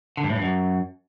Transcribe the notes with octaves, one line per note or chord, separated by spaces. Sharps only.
D3
G2
A2
G2
F#2